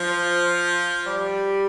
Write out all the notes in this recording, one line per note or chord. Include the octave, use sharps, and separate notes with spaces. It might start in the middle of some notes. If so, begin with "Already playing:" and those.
Already playing: F3
G3